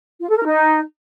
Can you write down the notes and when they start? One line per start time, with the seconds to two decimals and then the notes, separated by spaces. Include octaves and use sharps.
0.20 F4
0.29 A4
0.37 A#4
0.46 D#4